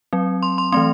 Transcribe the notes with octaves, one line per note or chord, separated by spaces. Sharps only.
F#3 C4
C6
C6
E3 A3 C4 C6